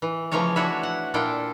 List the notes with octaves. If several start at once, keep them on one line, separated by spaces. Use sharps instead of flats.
E3
C#3 E3 F3 A3 C#5 A#5
D4 E4 F#4 B4 C#5 E5
F#5
A#2 D4 E4 F4 A4 G5